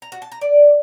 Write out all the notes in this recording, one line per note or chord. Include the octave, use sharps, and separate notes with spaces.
A#5
F#4
A5
A#5
D5